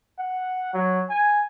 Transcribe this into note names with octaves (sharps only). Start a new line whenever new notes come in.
F#5
F#3
G#5